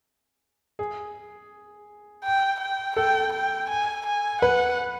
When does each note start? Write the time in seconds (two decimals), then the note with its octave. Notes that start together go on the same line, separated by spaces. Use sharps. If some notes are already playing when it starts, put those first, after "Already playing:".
0.79 G#4
2.25 G5
2.60 G5
2.96 A4 G5
3.33 G5
3.70 G#5
4.06 G#5
4.42 B4 F#5